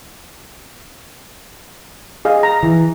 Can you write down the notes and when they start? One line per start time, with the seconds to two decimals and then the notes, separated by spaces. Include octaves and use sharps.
2.25 G#4 D#5 F5
2.43 A#5
2.63 E3